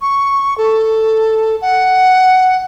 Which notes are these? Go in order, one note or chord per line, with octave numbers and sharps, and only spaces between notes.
C#6
A4
F#5